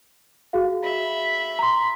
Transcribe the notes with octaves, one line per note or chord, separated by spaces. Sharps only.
F#4 G#4 F5
E5 B5
A#5 C6